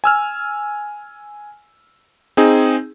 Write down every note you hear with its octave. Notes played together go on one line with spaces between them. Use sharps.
G#5 E6 F6
C4 D#4 G#4